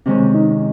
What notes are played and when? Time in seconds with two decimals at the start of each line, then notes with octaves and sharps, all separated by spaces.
0.06 C3 D#3 G#3 C4 C#4
0.34 D#4